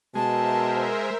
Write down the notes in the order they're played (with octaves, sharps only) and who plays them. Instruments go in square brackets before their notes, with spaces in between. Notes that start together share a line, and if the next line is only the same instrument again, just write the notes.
[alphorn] B2 [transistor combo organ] G#3 [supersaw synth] A#4 C5 E5 [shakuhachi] A5